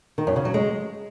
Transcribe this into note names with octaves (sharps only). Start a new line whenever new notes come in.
D#3
F#2
C#3
F#3
G#3